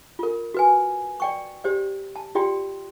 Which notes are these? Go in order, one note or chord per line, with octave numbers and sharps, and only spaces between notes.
F4 A#4
F#4 B4 G#5
D5 G5 C#6
G4 C5 D5
A5
F4 G4 D5 G5 C6